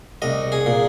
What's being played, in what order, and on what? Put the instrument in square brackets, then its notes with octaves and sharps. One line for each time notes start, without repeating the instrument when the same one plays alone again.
[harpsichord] C2 D#5
G#4
A#2